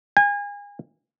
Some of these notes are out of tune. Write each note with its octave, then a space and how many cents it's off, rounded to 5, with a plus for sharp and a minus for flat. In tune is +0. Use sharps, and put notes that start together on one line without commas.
G#5 -30